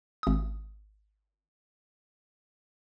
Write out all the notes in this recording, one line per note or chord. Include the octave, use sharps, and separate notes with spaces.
G#1 D#6